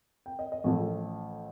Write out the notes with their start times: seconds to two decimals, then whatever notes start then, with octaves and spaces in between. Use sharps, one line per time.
0.26 G5
0.39 D#5
0.52 D#5
0.64 A1 A2 F3 A3